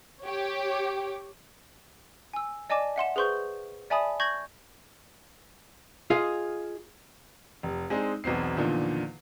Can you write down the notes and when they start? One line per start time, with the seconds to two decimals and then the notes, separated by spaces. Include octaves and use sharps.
0.22 G4 C#5
2.34 G#5 E6
2.70 D5 D#5 G#5 A5 D6
2.96 E5 F#5 C6 E7
3.16 G#4 B4 C5 C6 C#6 G6
3.90 D5 E5 G#5 A5 B5 D#6
4.20 C#6 G6 G#6 A#6 F#7
6.10 F4 G#4 D#5 F5
7.63 F1
7.90 G#3 C4 D4 D#4 G#4
8.24 E1 B1 B3 C4 C7
8.56 E2 A#2 D3 D#3 F3